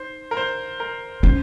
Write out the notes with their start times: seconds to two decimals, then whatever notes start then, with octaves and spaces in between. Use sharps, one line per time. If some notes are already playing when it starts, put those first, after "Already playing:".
Already playing: D#4 C5
0.31 A#4
0.37 C5
0.80 A#4
1.23 C#4 C5